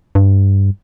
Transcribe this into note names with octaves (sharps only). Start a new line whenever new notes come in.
G2